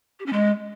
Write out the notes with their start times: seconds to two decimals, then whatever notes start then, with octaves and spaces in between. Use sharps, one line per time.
0.20 G4
0.26 C#4
0.33 G#3